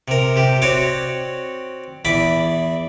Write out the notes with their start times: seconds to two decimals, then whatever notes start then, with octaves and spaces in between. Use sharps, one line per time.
0.08 C3 A#4
0.36 C3 G4
0.62 C4 F#4 C#5 D5
2.05 E2 D5 E5 B5